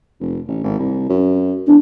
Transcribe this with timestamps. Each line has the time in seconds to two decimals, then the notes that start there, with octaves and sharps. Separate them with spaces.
0.20 F1
0.48 A1
0.64 G#1
0.79 C2
1.09 F#2
1.68 E2 D4